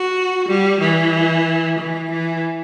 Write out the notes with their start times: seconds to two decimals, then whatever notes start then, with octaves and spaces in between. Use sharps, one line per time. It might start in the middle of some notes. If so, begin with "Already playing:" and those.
Already playing: F#4
0.48 G3
0.81 E3
1.78 E3
2.10 E3